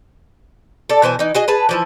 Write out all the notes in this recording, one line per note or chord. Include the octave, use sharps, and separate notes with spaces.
A4 D5
B2 E3 C5 G#5
E3 D#4
F#4 G#4 D#5
G#4 B4 A5
E3 F3 E4